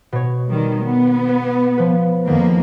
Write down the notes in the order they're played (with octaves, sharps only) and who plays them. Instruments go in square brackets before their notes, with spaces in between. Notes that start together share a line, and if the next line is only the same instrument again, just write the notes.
[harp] B2 C#5
[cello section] D#3 G3
B3
[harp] B4
F3 B4
[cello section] F2 F3 A#3 [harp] D#3 B3